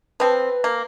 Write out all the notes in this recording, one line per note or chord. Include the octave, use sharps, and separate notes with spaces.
F3 C4 B4
A#3